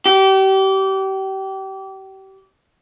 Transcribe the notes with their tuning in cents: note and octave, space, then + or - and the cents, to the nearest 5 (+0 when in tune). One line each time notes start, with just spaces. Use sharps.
G4 -30